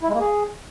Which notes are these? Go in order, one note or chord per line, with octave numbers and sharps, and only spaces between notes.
E4
G#3
A#3
G#4